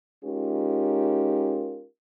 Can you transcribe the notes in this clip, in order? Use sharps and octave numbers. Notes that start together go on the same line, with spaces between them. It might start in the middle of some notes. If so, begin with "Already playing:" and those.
G#3 C#4 D#4 F4 G4 A#4